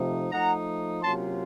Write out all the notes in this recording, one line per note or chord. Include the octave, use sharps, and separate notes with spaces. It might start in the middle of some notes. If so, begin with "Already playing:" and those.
Already playing: C3 F3 A3 D#4
F3 A3 D#4 F#5 A#5
C3 F#3 A#3 C#4 F4 A5 C6